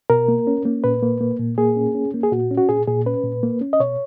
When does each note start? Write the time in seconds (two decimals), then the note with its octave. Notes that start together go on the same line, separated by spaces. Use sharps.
0.10 B2 A#4
0.28 A#3
0.47 C#4
0.65 A#3
0.84 A#2 B4
1.02 A#3
1.21 A#3
1.39 A#2
1.58 A#3 G#4
1.77 C#4
1.95 C#4
2.14 A#3
2.23 G#4
2.32 A#2 F#4
2.51 C#4
2.58 F#4
2.69 A#2 G#4
2.88 A#2 G#4
3.06 C#4 B4
3.24 A#2
3.43 A#3
3.61 C#4
3.73 D#5
3.80 B2 C#5